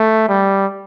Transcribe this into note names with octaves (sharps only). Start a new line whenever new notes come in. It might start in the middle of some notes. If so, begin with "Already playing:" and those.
Already playing: A3
G3